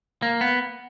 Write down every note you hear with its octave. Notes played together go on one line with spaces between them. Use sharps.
A#3
B3